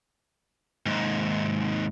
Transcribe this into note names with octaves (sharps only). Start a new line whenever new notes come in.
D#2 G#2